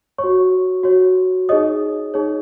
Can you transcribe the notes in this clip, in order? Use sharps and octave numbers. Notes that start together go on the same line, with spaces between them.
C#5 C#6
F#4
F#4 C#5
D#4 G#4 C#5 D#5 D#6
D#4 G#4 C#5